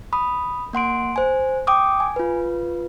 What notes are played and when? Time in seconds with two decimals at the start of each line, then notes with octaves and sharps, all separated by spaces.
0.13 B5 D#6
0.73 A#3 F#5 C6 D7
1.16 C5 G#5
1.67 G5 D6 D#6
2.00 G#5
2.16 F4 B4